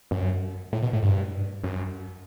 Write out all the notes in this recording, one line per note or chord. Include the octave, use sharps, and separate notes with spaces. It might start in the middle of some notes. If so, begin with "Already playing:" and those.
F#2
A2
B2
A2
G2
F#2